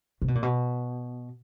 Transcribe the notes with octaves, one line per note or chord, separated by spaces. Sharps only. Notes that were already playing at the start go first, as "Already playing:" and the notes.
C3
B2
A#2
B2